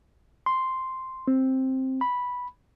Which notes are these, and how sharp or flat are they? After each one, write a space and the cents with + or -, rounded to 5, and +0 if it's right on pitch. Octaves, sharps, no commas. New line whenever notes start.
C6 -5
C4 +5
B5 -5